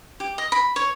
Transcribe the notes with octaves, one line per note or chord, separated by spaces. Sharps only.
G4
D#5
B5
C#5